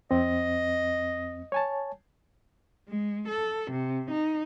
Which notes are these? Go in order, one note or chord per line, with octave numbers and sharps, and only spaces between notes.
F2 C4 D#5
C#5 G#5 A5
G#3
A4
C3
D#4